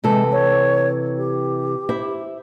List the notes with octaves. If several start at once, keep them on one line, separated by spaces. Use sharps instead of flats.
C3 E3 G#3 A4
C#5
G4
E4 C5 E5